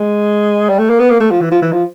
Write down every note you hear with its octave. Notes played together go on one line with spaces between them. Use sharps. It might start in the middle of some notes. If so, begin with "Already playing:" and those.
Already playing: G#3
G3
A3
A#3
B3
A#3
A3
F3
E3
F3
E3
F3